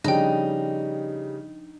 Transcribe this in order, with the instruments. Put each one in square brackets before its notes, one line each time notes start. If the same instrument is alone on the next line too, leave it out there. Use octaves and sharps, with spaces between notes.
[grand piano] C#3 G3 [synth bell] F3 D4 [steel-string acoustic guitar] D#4 [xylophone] D#5 G5